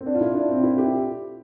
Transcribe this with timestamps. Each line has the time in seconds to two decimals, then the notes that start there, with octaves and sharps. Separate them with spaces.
0.01 C4
0.06 D4
0.15 F4
0.21 E4
0.35 D4
0.49 C4
0.64 E4
0.78 G4